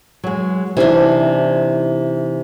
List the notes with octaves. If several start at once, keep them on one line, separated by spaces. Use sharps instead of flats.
F#3 G#3
C3 E3 D4 D#4 C5